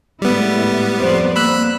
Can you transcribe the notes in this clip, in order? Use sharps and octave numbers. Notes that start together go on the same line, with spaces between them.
A2 G3 G#3 B3 E4
F2 C5 D5
A#3 B5 E6 F#6